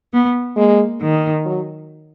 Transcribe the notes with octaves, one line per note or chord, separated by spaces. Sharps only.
B3
G#3 A#3
D#3
F#3